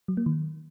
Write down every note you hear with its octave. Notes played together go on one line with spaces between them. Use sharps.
F#3
A#3
D#3